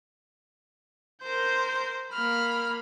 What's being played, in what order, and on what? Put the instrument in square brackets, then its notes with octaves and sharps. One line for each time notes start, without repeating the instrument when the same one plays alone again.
[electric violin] A#4 G6 [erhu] C5
[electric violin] A#3 B5 [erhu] F6